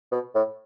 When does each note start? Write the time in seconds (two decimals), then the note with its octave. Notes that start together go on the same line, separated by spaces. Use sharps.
0.12 B2
0.35 A2